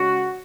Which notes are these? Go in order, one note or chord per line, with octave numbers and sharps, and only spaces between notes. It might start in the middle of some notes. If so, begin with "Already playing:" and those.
Already playing: C#3 G#3 F#4